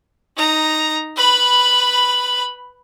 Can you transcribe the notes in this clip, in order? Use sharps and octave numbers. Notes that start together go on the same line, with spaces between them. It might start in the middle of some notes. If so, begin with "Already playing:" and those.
D#4 A#5
B4 B5